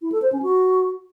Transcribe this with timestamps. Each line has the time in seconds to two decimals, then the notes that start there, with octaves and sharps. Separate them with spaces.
0.02 E4
0.12 A4
0.22 C5
0.32 C#4
0.43 F#4